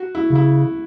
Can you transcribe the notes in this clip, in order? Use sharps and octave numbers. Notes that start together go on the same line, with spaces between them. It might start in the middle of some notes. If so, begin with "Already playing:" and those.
Already playing: F#4
E4
C#3
E4